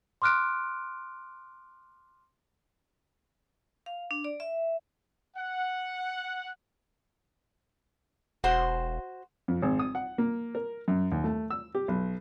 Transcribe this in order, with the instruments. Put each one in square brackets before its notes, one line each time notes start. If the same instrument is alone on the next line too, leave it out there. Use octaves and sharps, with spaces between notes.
[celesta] C6 D6 F6 F#6 D7
[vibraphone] F5
D4
D5
E5
[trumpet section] F#5
[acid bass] E1 [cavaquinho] F#4 C5 C6
[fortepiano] F2
G#1
D#6
F#5
A#3
A#4
F#2
D#2
A3
E6
G4
B1